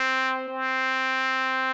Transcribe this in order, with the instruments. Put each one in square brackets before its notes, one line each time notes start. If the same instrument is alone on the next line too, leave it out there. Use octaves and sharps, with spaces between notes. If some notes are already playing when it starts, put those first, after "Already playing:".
Already playing: [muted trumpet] C4
C4